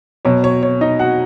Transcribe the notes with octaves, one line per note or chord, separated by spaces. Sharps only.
B2 F#3 C#5
C#5
C#5
D#4 D#5
F#4 F#5